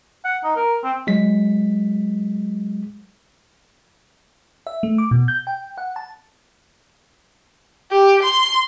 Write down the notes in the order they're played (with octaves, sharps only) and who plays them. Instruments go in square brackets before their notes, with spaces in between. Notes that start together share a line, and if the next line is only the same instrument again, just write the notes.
[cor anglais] F#5
D#4
A#4
C4
[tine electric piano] F#3 G#3 B6
[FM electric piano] E5
A3
D6
B2
G6
G5
F#5
A5
[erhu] G4
C6